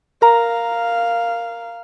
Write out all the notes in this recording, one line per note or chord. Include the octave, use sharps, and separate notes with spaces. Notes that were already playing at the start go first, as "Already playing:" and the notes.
A#4 F5 A#5